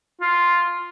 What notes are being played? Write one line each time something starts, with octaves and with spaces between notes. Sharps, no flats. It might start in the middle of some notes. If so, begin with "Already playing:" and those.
F4